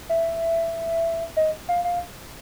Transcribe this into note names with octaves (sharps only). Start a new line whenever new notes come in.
E5
D#5
F5
F5